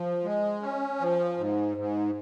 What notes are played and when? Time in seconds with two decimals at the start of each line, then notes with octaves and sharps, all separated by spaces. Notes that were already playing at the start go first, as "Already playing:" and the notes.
Already playing: F3
0.24 G#3
0.62 C#4
1.00 F3
1.38 G#2
1.77 G#2